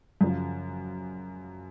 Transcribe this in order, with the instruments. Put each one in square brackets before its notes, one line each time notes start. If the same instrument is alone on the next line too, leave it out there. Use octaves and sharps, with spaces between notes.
[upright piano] F#2 C#3 F3